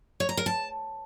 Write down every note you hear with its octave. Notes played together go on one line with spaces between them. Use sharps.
C#5
A#5
A#4
A5